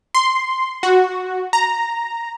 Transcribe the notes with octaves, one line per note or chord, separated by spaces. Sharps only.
C6
F#4
A#5